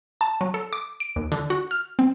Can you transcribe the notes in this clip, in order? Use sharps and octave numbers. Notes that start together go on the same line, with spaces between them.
A5
F#3
A4
D6
D7
D#2
D3
F#4
F6
C4